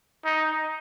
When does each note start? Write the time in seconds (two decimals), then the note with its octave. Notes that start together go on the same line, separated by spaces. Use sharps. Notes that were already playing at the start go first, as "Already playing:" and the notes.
0.25 D#4